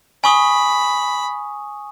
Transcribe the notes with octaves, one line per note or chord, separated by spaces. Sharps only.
G#5 B5 C#6 D#6